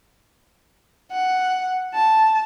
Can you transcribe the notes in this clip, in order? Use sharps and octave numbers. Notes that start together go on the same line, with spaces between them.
F#5
A5